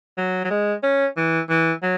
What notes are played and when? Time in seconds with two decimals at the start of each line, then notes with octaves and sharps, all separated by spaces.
0.17 F#3
0.44 F#3
0.50 G#3
0.83 C#4
1.17 E3
1.49 E3
1.82 F#3